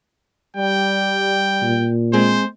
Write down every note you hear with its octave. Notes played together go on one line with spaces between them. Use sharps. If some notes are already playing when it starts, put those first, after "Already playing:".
G3 G5
A#2
G#3 C4 G#4 C5